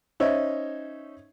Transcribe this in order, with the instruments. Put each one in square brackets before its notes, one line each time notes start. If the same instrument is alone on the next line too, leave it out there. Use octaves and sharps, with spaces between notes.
[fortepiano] C#4 D#4 C5 C#5 E5